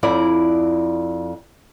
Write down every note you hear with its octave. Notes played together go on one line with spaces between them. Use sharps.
F2 E4 D5